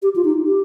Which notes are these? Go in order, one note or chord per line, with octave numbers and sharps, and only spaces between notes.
G4
F4
D#4
G4